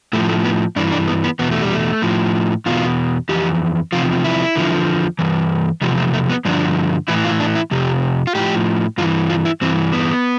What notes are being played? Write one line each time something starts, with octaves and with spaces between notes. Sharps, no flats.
A2 F3 A3
A3
B3
G2 E3 D4
D4
B3
B3
E2 B2 B3
A3
G3
A3
A2 F3
E2 B2 F4
F2 E3 G4
E2 C3 F3 F4
E4
E2 D3 F3
G2 E3
E2 C3 F3 G3
A3
A3
B3
G2 D3 F3 D4
A2 E3 E4
F4
D4
E4
F2 C3 G4
F4
A2 F3 G4
G2 E3 F4
F4
E4
G2 E3 C4
B3